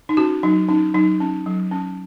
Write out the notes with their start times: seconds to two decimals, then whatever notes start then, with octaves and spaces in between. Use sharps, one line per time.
0.09 D#4
0.17 C#4 F#4
0.43 F#3 D#4
0.68 C#4 D#4
0.94 F#3 D#4
1.20 C#4
1.46 F#3
1.71 C#4